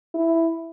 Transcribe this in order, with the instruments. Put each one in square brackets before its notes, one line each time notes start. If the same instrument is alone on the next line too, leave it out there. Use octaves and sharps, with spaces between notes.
[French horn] E4